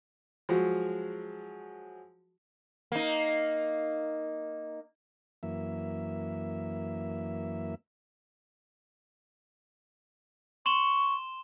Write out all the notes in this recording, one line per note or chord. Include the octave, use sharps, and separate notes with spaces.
F3 F#3 G#3 F#4
A#3 D#4
F#2 E3 A#3 E5
C6 C#6 E7 G7